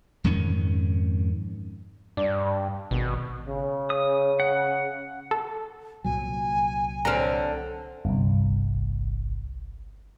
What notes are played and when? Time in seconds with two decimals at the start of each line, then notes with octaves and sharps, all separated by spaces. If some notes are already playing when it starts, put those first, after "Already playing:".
0.24 F2 G#2 D#3 C#4
2.17 G2 D4
2.91 G#1 B2
3.47 C#3
3.90 D#6
4.40 F#5
5.31 A4
6.05 C2 A#2 F#3 G#5
7.05 D3 C4 A#5 F6
8.05 G1 C2